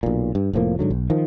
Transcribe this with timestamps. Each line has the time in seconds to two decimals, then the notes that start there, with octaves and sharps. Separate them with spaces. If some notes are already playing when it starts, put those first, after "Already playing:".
0.03 B1 A#2
0.35 G2
0.53 F1 A2 F3 A#3
0.79 G#2 D3 F#3
0.91 B1
1.10 D#3 F3